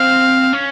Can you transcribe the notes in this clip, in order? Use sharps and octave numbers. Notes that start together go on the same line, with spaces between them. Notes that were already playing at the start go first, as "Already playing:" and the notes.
Already playing: C4 F5
C#4